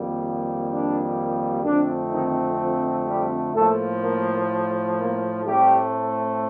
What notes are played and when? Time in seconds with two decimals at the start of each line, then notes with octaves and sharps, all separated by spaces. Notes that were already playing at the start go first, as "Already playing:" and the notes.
Already playing: F2 D#3 G3 A#3
0.69 D4
1.64 F2 D3 A3 C4 D4
2.12 D#3 D#4
2.59 F3 F4
3.06 G3 G4
3.54 A2 F3 A3 A#3 A4
4.02 A#3 A#4
4.97 A#3 A#4
5.44 A2 G3 A3 C4 G4